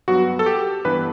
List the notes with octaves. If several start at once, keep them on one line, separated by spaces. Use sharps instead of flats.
G2 F#3 B3 F#4
A4
G4
G2 E3 B3 B4